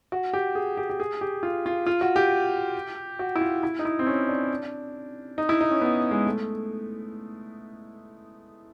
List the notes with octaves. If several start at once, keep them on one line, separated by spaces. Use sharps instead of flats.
F#4
G4
G#4
G4
G4
G#4
G4
F4
F4
F4
F#4
G4
F#4
E4
F4
E4
D#4
E4
C4
C#4
D4
D#4
E4
D#4
C#4
B3
G#3
A3